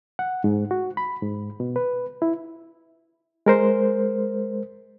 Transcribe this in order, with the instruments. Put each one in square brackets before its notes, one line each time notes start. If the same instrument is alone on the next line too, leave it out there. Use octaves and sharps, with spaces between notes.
[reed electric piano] F#5
G#2
F#4
B5
G#2
B2
B4
E4
G#3 A#4 C5